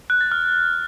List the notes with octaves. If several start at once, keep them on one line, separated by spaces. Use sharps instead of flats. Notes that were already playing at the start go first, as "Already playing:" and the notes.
F#6
A6
F6